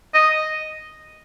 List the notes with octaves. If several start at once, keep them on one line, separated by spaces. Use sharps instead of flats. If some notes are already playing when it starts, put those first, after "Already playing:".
D#5